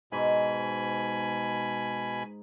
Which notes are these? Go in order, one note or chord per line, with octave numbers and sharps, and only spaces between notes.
G#2 B2 G#5 B5